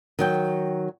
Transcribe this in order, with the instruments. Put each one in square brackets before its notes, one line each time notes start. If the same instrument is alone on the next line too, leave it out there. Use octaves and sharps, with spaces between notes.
[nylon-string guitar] D#3 F#3 G5